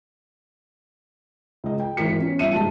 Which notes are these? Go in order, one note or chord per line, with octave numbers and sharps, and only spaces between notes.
C#2 D#5
G5
G#1 E3 A#4 B6 C#7
B3 C#4
G2 F3 E5 C#7 D#7
F#1 G#2 G3 F4 A5